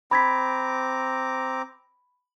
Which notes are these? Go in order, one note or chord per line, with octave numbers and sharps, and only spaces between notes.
C4 A#5 B5 D6 G#6 B6